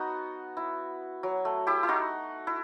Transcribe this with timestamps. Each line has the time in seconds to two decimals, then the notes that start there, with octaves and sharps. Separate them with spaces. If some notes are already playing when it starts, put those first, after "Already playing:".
Already playing: B3 D#4 F#4
0.57 E4
1.23 F#3
1.45 A3
1.67 E4 G4
1.83 E4
1.88 D#4 F#4
2.47 E4